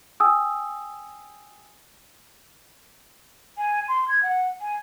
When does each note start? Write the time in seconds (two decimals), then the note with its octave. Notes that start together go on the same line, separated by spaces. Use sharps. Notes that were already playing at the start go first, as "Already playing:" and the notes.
0.20 G5 G#5 D#6 E6
3.58 G#5
3.88 C6
4.08 G#6
4.23 F#5
4.61 G#5